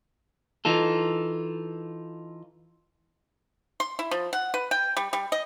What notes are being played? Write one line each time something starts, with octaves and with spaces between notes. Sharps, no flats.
E3 D#4 F4 A4
C6
E4
F3
F#5
B4
G5
G3
G3
D#5